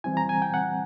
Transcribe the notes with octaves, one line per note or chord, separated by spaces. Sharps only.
E3 G3 C4 E4 G#5
A#5
G#5
G5
F#5